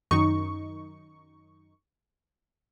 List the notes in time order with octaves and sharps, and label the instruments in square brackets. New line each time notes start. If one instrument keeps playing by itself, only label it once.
[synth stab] F#2 D#3 D#4 C#6